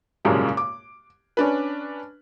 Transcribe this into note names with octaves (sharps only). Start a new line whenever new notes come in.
C2 F#2 A#2 C#3 G#3 A#3
D6
C#4 D4 B4